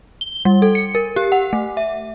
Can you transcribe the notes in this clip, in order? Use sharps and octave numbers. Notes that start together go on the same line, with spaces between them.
G7
G3
A4
C#7
A#4
G4
F#5
A3
E5